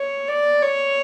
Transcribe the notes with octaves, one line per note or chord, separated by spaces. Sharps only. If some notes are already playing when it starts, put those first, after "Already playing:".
Already playing: C#5
D5
C#5